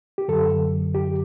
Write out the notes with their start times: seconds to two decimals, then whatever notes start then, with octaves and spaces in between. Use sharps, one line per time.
0.18 G4
0.28 F#2 D3 F#3 A4
0.95 G4